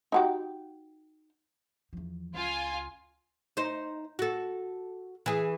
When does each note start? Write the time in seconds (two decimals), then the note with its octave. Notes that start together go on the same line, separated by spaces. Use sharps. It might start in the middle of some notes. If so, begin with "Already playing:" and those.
0.12 D#4 F#4 G4
1.93 E2 F3
2.34 C#2 F4 G#5
3.57 D#4 C5
4.19 F#4 A4
5.26 E3 G#4